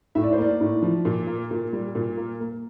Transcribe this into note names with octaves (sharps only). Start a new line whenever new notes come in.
A2 E5
D5
C5
A#3 D5
A2
F3
A#2
A#3
A#2
G3
A#2
A#3
A#3